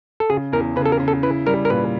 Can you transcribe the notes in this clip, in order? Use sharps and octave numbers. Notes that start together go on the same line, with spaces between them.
A4
C#3 G#4
E2 A#4
C#3 B4
A4
A#4
C#3
A4
E4 B4
G3 A#4
A#4
A#2 B4